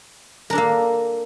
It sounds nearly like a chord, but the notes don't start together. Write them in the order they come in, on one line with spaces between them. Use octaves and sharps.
A#4 D4 A4 A#3